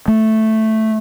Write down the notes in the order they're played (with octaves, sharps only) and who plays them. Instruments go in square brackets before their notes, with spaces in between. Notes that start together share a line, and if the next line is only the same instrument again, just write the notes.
[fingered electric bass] A3